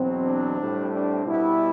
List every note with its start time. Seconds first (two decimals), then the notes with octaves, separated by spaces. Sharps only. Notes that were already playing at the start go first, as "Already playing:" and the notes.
Already playing: E2 B2 F#3 C4
0.25 D4
0.59 A2 G3 C4
0.93 D4
1.26 B2 G3 B3 E4